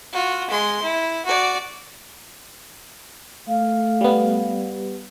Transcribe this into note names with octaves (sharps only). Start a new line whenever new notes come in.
F4 F#4
G#3 C6
E4
F#4 D5
A3 F5
G3 B3